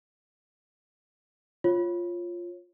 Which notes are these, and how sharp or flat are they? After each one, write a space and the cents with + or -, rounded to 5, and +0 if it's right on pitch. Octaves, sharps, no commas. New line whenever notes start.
F4 +0 C#5 -20